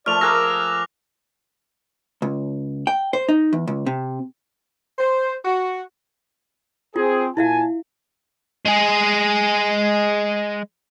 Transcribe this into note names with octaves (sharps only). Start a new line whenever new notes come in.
F3 A3 D5 F6 F7
G#4 A#4 D6 E6 F#6 A#6
C#2
G5
C5
D#4
E2
C#2
C3
C5
F#4
C4 F4 G#4
A#2 E4 E5 F5 G#5 A5
G#3 G#4